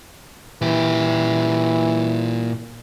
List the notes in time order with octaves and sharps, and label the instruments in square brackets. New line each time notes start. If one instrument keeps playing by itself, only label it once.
[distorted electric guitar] A#2 G4 [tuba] E3